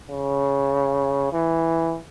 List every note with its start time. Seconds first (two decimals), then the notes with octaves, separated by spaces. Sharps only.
0.11 C#3
1.33 E3